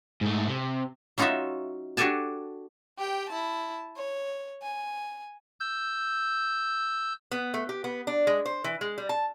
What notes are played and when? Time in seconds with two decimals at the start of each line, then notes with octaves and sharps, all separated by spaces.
0.21 G#2 A3
0.48 C3
1.18 F#3 C#4 D#4 F4 F#4 E5
1.97 D4 F#4 G4 A4 G#5 A5
2.98 G4 G5
3.29 E4 A5
3.97 C#5
4.62 G#5
5.60 E6 G6
7.31 B3
7.54 A3
7.69 G4
7.84 B3
8.07 D4
8.27 G#3
8.46 C5
8.64 E3
8.81 G#3
8.98 G3
9.09 A5